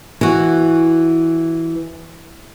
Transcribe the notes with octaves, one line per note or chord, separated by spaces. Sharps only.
E3 F#4